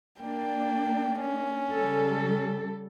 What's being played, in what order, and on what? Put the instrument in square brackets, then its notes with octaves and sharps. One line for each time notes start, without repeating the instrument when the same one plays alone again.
[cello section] A#3 D4 [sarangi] G5
[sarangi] C#4
[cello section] C#3 G3 A4